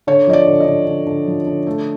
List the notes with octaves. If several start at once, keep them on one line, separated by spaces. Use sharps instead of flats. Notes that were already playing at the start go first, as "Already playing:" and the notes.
D3 C#5
F3 D#5
D5
D3
D#5
D3
D3
D3
F3
D3
A3